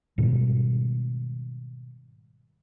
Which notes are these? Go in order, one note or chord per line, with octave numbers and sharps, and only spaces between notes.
G#2 B2 D#3 G3